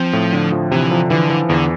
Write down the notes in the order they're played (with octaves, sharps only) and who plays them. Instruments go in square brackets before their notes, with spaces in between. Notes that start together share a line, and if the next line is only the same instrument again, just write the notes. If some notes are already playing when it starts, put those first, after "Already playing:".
Already playing: [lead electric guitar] F3 [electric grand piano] C4
[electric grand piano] A2
D3
F3
[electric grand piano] C3 [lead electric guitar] E3
[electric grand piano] F3
[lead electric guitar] D3 [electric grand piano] E3
[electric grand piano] E3
[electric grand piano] E2 [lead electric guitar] D3